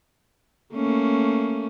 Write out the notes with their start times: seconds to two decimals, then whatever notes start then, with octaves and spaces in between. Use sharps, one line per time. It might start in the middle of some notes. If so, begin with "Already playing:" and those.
0.74 A3 A#3 C#4